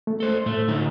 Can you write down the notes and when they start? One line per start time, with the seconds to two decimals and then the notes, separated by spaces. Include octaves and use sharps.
0.07 A3
0.20 A4 C5
0.46 A2 A3
0.68 D3 F#3 D#4